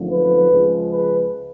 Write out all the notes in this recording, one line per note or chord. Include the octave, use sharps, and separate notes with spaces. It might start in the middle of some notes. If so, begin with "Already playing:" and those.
Already playing: G#1 F#2 D3 F3 A3
B4
C#2 C#3 F3 G#3
B4